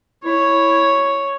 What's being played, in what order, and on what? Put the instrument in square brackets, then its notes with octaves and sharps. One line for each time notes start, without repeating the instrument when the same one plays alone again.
[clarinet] E4 [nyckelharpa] C#5